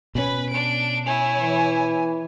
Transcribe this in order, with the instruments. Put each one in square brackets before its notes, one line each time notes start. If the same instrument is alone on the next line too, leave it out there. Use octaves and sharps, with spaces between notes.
[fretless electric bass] B2 C#4 [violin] B4 B5
[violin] D4 D7
[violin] E4 C#5 [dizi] G#5
[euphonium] E3